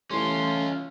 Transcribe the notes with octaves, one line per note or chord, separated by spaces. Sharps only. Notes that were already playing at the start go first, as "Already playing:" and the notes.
E3 G3 A3 C#4 F4 C6